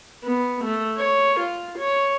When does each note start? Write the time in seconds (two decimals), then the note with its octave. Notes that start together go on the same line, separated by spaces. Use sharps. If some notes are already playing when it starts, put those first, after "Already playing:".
0.24 B3
0.64 A3
0.97 C#5
1.40 F4
1.78 C#5